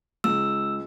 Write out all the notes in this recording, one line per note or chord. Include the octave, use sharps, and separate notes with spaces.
C#2 E6